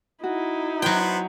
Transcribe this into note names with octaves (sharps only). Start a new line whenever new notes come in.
D#4 E4 F#4
F#3 B3 B4 C5 G5